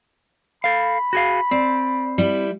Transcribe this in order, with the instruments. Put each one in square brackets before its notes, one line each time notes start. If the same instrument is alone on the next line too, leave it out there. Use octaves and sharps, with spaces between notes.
[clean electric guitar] A4 F5 [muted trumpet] B5
[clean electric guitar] F#4 G#4 F5
[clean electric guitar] C4 [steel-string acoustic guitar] D5
[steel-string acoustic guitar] G3 E4